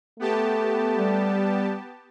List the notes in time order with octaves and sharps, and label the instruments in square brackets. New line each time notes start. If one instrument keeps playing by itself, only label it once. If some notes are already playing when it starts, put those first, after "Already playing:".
[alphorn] A3 [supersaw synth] B3 G4 A5
[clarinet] G3